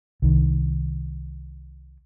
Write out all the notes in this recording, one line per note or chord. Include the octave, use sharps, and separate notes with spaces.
C2 D#3